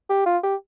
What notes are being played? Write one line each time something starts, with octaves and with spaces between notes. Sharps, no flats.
G4
F4
G4